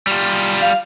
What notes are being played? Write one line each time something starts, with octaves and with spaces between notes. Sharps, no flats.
G3 F4
F5